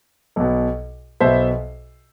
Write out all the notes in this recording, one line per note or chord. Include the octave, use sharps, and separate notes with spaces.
B1 B2
B1 B2 C5 E5